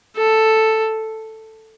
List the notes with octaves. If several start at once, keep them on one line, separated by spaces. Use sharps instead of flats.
A4